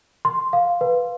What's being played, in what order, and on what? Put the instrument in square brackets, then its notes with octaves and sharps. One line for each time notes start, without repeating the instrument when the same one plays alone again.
[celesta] C6
F5
B4